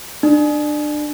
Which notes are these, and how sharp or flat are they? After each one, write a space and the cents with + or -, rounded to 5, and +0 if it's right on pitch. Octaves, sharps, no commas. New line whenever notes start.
D4 +25